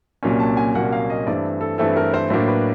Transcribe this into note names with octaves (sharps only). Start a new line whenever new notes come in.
C2 A#2 F#3 A#3 C#4
A5
G#5
C2 A#2 F#3 A#3 C#4 F#5
F5
D#5
G2 E3 A3 C4 D5
A4
G2 E3 A3 C4 A4
A#4
C5
A2 F#3 A#3 D4 C5
B4